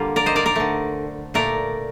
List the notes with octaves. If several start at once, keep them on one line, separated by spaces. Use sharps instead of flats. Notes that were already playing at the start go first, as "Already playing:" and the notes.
Already playing: D3 G3 A#3 F4
A#4 D5
C5 D#5
A#4 D5
A#4 D5
D3 A3
A#2 A3 A#4 D5